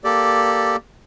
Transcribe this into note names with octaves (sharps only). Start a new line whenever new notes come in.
A#3 G4 A4 D5